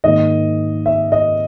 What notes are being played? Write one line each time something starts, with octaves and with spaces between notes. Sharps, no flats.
G#2 D#3 A#3 D#5
E5
D#5